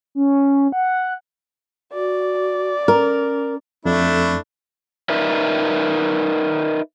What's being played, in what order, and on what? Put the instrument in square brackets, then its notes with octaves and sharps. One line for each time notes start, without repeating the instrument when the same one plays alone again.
[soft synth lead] C#4
F#5
[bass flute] F#4 [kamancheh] D5
[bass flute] C#4 [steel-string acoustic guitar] A#4
[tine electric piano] F2 [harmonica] A3 D4 E4
[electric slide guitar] D#4 A#4 B4 D5 E5